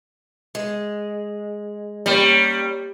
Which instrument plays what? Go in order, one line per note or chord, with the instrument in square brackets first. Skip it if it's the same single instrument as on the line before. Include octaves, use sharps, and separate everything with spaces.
[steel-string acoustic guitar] G#3
[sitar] G3 [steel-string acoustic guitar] A#3 C#4 G5